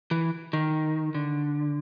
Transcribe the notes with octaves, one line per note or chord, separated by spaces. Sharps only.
E3
D#3
D3